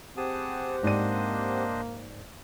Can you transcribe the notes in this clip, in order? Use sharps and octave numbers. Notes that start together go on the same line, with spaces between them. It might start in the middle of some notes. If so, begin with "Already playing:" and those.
C4 G4 G#4 F#5 A5 D#6
G#2 A#3 D4 C5 D5 D#5 D#7